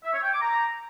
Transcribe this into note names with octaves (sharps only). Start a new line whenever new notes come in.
E5
C#5
G5
D6
A#5